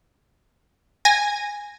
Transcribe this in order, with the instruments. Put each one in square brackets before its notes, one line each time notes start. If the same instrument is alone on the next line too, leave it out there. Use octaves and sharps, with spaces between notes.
[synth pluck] G#5 A#6